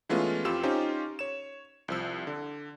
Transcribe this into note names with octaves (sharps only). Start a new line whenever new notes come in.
E3 G#3 A3 B3 C#4 F4
F2 F4 G4 E6 E7
C#4 D#4 F4 G4 C5
C#5 E7
C2 F3 E6
D3